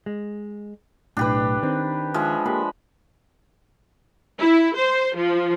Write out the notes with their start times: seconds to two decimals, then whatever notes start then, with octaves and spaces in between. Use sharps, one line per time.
0.06 G#3
1.17 B1 A2 D4 G4 B4
1.62 D#3 C4
2.14 F3 G#3 E5
2.46 A#3 G4 B5
4.39 E4
4.75 C5
5.15 F3